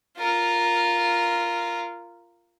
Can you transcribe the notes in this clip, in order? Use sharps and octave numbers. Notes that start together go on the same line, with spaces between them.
F4 A#4